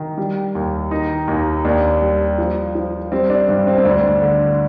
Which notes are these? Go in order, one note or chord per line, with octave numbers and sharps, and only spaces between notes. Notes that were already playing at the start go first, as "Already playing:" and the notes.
Already playing: D#3
G3
D#2
D#3 D#4
D#2 D#4
D#2 D4
G3
F3
F3
G3 C4
D4
G2 D4
C4
C4
D2 D4
D3